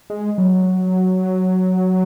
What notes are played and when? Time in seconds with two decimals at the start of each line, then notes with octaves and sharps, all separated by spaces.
0.10 G#3
0.38 F#3